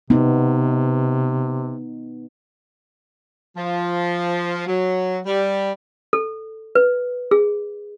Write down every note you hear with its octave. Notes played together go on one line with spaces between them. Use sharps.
C3 B3 D#4
F3
F#3
G3
A4
B4
G#4